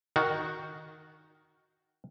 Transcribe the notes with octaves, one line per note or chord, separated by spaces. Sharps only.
D#3 F#4